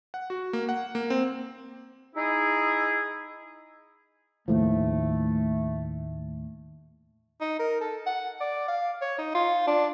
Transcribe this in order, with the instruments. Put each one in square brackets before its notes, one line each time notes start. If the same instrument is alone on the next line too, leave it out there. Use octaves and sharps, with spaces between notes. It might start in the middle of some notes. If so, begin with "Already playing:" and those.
[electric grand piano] F#5
F#4
A#3
F#5
A#3
C4
[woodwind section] D#4 E4 G#4
[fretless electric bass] D#2 A2 F3 [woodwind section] A3
[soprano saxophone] D#4
A#4
A4
F#5
D5
F5
C#5
D#4
F4
D4